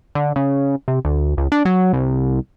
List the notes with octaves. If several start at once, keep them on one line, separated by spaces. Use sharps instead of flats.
D3
C#3
C3
D2
C#2
D4
F#3
C2